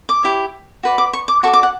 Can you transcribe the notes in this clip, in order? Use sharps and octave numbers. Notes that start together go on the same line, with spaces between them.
D6
E4 G4 C#5
F#4 B4 D5
D6
C#6
D6
F#4 A4 D5 C#6
D6
F#5